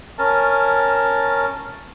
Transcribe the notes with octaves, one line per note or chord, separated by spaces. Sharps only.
C#4 A#4 A5